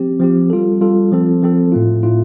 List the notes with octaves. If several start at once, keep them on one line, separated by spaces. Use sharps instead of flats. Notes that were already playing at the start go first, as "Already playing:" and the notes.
Already playing: F3 C4 G4
F3 C4 G4
G3 F4 A4
G3 F4 A4
F3 C4 A4
F3 C4 A4
A2 A3 F4
A2 A3 F4